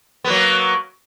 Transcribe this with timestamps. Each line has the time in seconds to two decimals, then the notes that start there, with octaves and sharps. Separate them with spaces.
0.24 B3
0.27 A#3
0.30 F#3